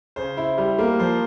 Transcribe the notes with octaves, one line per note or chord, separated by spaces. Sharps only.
C#3 C5
E4
G3
A#3
F3 C5